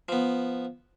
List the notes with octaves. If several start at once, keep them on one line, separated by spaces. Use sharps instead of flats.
F3 B3